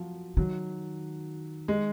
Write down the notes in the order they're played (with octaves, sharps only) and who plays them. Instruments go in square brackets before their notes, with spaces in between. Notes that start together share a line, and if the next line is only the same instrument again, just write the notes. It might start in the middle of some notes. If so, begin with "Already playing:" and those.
Already playing: [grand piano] F3 F#3
[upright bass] D#3 [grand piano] F#3
[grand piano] G#3